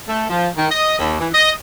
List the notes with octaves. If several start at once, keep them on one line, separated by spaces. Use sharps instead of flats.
A3
F3
D#3
D#5
D#2
E3
D#5